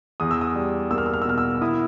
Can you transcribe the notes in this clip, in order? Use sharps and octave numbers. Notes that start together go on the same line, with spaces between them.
E2 D#6
E6
D#6
G3
A#3 E6
F6
E6
F6
E6
B2 F6
E6
E4 D#6